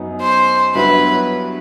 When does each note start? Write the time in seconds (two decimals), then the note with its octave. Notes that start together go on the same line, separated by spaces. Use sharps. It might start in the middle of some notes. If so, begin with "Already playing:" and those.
Already playing: F#2 F#3 B3 D#4
0.21 C5
0.75 G2 F#3 B3 E4 B4